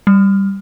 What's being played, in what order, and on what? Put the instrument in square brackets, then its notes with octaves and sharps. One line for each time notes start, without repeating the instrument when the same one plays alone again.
[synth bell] G3